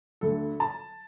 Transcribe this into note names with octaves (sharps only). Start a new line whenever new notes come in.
D2 D3 A4
A5